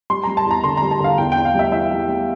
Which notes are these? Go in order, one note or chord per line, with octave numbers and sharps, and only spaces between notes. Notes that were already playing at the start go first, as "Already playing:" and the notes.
G3 C6
G3 A#5
A5
E2 A#5
D3 C6
G3 A#5
A5
D3 F5
E2 G5
E2 G5
F5
G3 E5
E3 E5
G3
G3